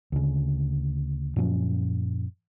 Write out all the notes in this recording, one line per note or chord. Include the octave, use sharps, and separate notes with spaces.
D2 C#3
F#2 A#2 F3 C#4